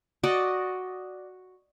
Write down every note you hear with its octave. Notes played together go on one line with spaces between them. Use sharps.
F#4 D5 D#5